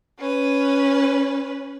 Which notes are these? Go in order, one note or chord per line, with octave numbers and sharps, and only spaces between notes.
C#4 B4